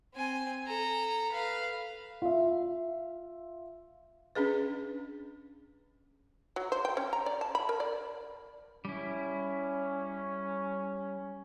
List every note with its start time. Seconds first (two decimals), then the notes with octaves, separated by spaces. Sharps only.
0.14 C4 G#5
0.66 A4 A#5
1.32 B4 F5
2.22 F4 E5
4.35 C#4 D4 G#4 B4
6.56 F#3
6.72 C5
6.85 G5
6.97 C#4
7.13 A#5
7.26 D5
7.41 A5
7.55 B5
7.69 A#4
7.80 D5
8.85 G3 C#4 E4